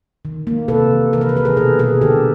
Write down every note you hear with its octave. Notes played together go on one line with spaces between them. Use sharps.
D#3
A#3
C3 A4 B4
E3
C3 A#4
B4
A#4
D#3 B4
G#4 A#4
B2 A4 B4
B2 G#4 A#4
D3 G4 A4